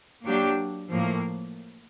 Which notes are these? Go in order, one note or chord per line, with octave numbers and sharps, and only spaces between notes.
F#3 A#3 D4 G4
A2 F3 A#3